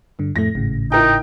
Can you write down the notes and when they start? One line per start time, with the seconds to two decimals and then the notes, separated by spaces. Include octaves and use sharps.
0.19 G2 D3
0.36 F2 A2 A3 A#6
0.55 G#1 A2 C#3
0.92 D#4 E4 A#4 G5